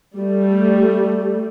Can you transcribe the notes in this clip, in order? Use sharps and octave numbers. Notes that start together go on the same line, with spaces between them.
G3 A3